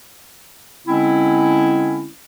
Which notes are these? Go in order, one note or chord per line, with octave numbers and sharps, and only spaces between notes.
D3 G#3 C4 C#4 E4